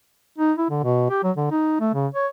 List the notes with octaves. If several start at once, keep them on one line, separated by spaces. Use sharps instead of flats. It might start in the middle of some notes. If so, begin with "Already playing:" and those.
D#4
E4
D3
B2
G4
F#3
D3
D#4
A3
C#3
C#5